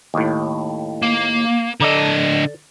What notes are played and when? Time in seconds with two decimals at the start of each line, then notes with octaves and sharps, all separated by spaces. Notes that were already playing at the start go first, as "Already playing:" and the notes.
0.14 D#2 A2
1.02 A#3
1.80 D3 A4 D5 D#5 A#5